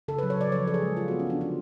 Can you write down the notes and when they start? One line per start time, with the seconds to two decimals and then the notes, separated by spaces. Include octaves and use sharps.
0.08 C#3 A4
0.19 F#3 B4
0.30 C#5
0.37 C#3 D5
0.52 F3 C#5
0.68 F3 A4
0.74 G#4
0.82 G#3
0.97 F3 F4
1.08 B3 F#4
1.20 C#4
1.27 F3 D4
1.41 D3 F4